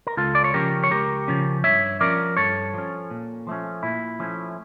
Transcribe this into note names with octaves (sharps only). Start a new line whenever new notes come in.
A#4
C#2 F4 A4
D5
C#5
C#3 F3 C#4 G4 A#4
C#5
C#2 G4 A#4
C#3 F3 C#4
G2 C#5 E5
F3 C#4 A#4 D5
G2 A4 C#5
F3 C#4
A#2
F3 A3 C#4
A#2 E4
F3 A3 C#4